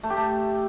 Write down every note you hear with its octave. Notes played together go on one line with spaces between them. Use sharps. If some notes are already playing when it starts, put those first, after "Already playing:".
A3
G4
A3